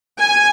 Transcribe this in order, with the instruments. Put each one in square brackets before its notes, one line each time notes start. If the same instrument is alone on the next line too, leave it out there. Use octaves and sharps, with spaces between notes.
[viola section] G#5